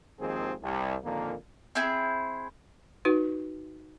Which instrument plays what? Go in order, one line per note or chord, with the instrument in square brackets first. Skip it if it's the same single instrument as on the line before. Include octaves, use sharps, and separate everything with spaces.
[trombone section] G#1 D#2 G#2 F3 C4 G#4
C2
F2 A#2 D3 D#3 A#3
[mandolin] C4 E4 G#4
[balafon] D#4 F#4 B4